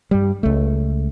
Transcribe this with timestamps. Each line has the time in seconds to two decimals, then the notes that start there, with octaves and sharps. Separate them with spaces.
0.11 G2 G3
0.43 C#2 A3